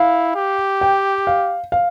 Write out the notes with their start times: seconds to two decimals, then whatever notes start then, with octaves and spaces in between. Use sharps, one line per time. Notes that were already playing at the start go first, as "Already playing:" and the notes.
Already playing: E4 F5
0.35 G4
0.81 G5
1.27 F5
1.72 F5